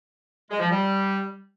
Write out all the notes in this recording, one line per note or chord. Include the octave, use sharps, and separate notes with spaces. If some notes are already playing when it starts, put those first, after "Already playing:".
G#3
F3
G3